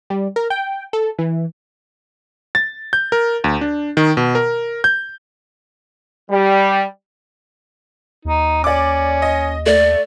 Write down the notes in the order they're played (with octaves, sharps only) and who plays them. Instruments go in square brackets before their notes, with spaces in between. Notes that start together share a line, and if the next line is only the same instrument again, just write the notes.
[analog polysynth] G3
A#4
G5
A4
E3
[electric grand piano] A6
G6
A#4
D2
D4
D#3
B2
A#4
G6
[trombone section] G3
[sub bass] D#2 [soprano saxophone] D#4
[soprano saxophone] C#4 [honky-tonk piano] D5 D6
[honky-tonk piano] D#5
[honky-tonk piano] A3 [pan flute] D5